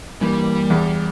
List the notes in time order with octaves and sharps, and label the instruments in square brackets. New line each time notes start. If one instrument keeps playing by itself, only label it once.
[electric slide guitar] G2 E3 A#3 [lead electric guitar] G3
[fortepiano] E2